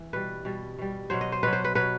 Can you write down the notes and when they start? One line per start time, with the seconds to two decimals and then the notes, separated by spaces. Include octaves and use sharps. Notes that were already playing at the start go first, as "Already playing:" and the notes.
Already playing: E3
0.13 B2 G3 B4
0.45 B2 G3
0.78 B2 G3
1.10 B2 F#3 C5
1.21 D#5
1.32 C5
1.43 B2 F#3 B4
1.53 C5
1.64 B4
1.75 B2 F#3 B4